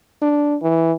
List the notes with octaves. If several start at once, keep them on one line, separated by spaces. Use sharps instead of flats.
D4
E3